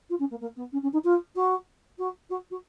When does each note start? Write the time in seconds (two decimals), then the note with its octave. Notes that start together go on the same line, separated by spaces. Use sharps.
0.09 F4
0.19 C#4
0.30 A#3
0.40 A#3
0.56 B3
0.72 C#4
0.82 C#4
0.93 D#4
1.04 F4
1.35 F#4
1.98 F#4
2.29 F#4
2.50 F#4